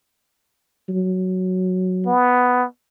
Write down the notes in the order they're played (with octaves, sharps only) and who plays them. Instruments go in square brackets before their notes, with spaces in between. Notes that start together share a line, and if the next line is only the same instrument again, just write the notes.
[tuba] F#3
[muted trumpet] B3